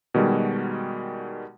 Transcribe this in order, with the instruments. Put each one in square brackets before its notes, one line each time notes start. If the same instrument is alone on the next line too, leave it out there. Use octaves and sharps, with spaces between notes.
[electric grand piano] B2 D#3 G3 G#3 F#4